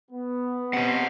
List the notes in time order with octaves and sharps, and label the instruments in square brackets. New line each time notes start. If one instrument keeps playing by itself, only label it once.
[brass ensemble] B3
[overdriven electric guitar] C3 C#4 [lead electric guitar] D#5 F#5